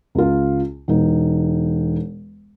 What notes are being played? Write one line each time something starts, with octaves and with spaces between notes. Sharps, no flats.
C#2 F4
E1 D#4